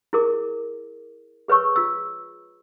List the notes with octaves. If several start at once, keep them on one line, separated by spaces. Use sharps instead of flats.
E4 G#4 A#4 D6
G#4 B4 C#5 C#6 E6
F4 E6